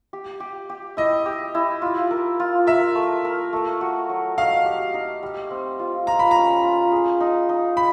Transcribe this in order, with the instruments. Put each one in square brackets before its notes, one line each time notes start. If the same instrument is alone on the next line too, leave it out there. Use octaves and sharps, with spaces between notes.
[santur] G4
G4
G4
[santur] E4 [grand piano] D#5
[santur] G4
E4
F4
A#4
F4
[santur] A#4 [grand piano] E5
[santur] A3
A#4
A3
F#4
F#3
[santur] D#4 [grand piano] F5
[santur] G4
D#4
G3
C4
F4
[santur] F4 [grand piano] A#5
[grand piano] B5
[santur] C#4 [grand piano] A#5
[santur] F4
G#4
D#4
D#4
[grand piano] B5